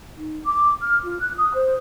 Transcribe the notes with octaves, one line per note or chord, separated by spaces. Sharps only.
D#4
D6
F6
F4
F#6
D#6
C5